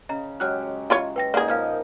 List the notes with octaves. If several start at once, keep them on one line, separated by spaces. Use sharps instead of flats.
C#3 D#5 A#5
F#3 G#3 G4 C#5 F6 F#6
E4 F4 C#5 D#5
B4 G5 A#6
A#3 D#4 G#4 D5 D#5 F#5
A#2 F3 F5 F6 G#6